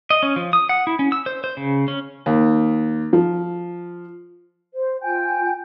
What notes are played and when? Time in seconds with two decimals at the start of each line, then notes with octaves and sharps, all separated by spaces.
0.10 D#5
0.23 C#4
0.36 F3
0.53 D#6
0.69 F#5
0.87 E4
0.99 C#4
1.12 E6
1.26 C5
1.44 C5
1.57 C#3
1.88 C#4
2.26 D#2
3.13 F3
4.74 C5
5.02 F4 G5 G#5 G6